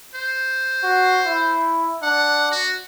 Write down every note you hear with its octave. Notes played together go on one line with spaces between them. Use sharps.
C5
F#4
E4
D4 F#5
F#4